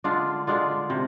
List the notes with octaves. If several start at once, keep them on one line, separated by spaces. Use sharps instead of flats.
D3 G#3 D4 F4
D3 G#3 D4 F4
C3